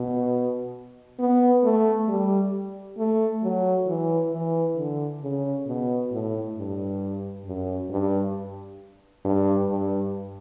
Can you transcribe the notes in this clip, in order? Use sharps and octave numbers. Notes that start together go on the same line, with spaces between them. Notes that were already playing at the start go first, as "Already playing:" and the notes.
Already playing: B2
B3
A3
G3
A3
F#3
E3
E3
D3
C#3
B2
A2
G2
F#2
G2
G2
G2